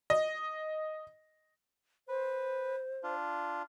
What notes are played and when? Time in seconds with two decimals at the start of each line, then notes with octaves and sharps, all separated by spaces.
0.10 D#5
2.09 B4 C5
3.03 D4 F4